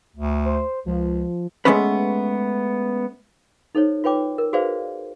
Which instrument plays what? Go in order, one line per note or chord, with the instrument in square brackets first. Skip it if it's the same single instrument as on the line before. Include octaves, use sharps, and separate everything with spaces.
[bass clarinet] D2
[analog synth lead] C5
[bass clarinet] C#2 [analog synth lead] F3
[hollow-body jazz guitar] G#3 A3 B3 C#4 B4
[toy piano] D#4 A4 C5 C#5
F4 B4 C#5 G5 D6
A#4
F#4 G#4 B4 C5 D5 F5